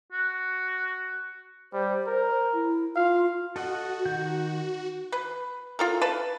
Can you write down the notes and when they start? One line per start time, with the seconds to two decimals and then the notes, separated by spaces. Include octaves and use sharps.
0.12 F#4
1.73 G3 C5
2.07 A#4
2.54 E4
2.96 F4 F5
3.56 F#4 A4 D#5 F#5
4.05 D#3 F#5 G6
5.12 B4
5.79 F4 A4 A#4
6.02 B4 A5